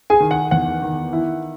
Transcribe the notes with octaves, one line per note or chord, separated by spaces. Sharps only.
G#4 G#5
D#3
F#5
E2 F#5
D#3
E4